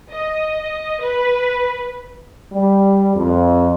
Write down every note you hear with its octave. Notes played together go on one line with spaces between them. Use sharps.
D#5
B4
G3
F2